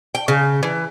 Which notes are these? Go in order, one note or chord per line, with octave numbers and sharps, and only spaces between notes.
G5
C#3
E3